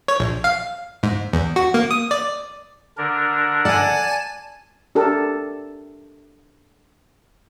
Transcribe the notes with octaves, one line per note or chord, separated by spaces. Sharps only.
C#5
A#1
F5
G#2
E2
F#4
A#3
D#6
D5
D3 D4 A#4
D5 F#5 G#5 A5
D4 G4 A4 A#4